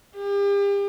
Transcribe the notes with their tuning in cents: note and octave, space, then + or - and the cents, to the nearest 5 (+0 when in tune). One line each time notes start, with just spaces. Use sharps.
G4 +40